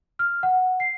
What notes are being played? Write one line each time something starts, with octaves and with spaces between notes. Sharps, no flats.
F6
F#5
C7